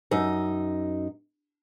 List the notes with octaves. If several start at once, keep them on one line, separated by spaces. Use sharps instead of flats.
F#2 D#4